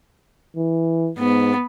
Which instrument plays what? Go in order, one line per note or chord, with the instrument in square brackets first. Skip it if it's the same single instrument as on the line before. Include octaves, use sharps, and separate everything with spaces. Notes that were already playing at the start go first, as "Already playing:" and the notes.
[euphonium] E3
[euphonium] G#2 [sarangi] B3